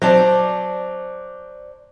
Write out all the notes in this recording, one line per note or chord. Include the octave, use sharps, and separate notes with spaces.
F#3 C4 C5 D5 A5